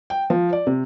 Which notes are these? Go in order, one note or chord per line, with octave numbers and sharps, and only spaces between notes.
G5
F3
D5
C3